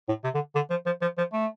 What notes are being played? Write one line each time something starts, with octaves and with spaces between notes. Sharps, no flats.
A2
C3
D3
D3
F3
F3
F3
F3
A3